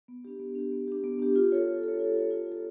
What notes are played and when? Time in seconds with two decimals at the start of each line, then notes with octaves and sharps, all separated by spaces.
0.08 B3
0.25 D4 G4
0.39 B3
0.55 D4 G4
0.72 B3
0.88 D4 G4
1.04 B3
1.19 D4 G4
1.36 F4
1.52 A4 C#5
1.68 F4
1.83 A4 C#5
1.99 F4
2.16 A4 C#5
2.31 F4
2.47 A4 C#5